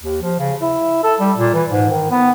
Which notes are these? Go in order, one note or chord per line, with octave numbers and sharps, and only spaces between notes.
D#2
F3
C#3
E4
A4
G3
A#2
E3
G#2
D#3
B3